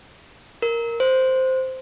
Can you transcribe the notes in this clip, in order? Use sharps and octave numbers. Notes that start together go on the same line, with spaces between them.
A#4
C5